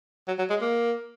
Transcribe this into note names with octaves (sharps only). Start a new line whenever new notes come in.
F#3
F#3
G#3
A#3